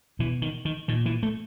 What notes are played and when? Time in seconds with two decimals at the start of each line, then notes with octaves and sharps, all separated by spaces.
0.19 B2 E3
0.42 D#3
0.65 D#3
0.88 A#2 D#3
1.06 E3
1.23 A3